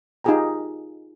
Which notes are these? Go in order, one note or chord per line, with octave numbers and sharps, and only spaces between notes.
D#4 F4 G4 G#4 G5 A#5